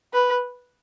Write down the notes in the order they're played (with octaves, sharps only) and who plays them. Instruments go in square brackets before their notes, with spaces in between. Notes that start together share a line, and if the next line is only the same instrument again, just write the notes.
[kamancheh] B4